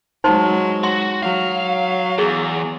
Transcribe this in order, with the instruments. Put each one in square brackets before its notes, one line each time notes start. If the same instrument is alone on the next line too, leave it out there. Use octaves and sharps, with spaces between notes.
[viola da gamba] F#3 G#3 [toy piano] D#4 C5 C6
[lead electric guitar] F#4 [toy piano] C6
[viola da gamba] F#3 [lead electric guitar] F5
[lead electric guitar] E2 [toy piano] G#4